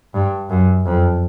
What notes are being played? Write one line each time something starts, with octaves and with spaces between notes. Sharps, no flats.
G2
F#2
F2